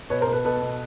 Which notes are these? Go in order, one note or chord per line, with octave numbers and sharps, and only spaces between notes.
B2 B4 C#5
A#4 C5
B2
A4 B4
B2 A4 B4
B2